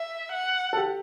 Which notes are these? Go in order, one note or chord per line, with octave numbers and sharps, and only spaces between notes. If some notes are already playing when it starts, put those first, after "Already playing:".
Already playing: E5
F#5
A4
G4